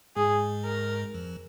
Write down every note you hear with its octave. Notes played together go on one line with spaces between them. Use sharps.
G#2 G#3 G#4
A#4
F2 F3